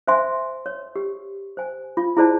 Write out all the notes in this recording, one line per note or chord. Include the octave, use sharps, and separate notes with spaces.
C5 E5 G#5 C6
C#5
G4
C5 G#5
F4
E4 G#4 C5 D5 A5